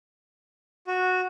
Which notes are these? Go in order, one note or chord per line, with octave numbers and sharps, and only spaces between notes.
F#4